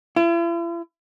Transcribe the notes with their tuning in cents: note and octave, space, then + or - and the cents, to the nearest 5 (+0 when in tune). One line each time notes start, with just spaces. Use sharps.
E4 +45